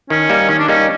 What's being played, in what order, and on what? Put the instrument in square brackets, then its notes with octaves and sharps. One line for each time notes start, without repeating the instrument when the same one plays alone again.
[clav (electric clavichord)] D#3 [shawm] C#4
[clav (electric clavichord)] G3 A#3 D#4
[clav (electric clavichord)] D#3 [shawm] C#4
[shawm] D4
[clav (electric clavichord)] G3 A#3 D#4 [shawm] C#4